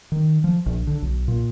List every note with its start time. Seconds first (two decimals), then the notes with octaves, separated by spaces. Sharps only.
0.12 D#3
0.44 F3
0.66 A#1
0.87 D3
1.02 B1
1.28 A#2